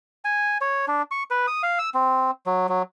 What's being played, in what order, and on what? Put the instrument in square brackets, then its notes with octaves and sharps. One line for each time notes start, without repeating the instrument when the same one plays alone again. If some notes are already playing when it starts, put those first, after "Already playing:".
[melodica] G#5
C#5
D4
C#6
B4
D#6
F5
E6
C4
F#3
F#3